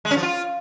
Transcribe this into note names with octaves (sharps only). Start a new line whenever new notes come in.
G#3
C#4
F3
F4